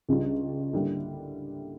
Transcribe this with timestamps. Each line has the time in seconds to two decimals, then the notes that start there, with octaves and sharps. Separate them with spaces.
0.09 C#2 C#3 G3 D4 F4
0.73 D3 G3 A#3 E4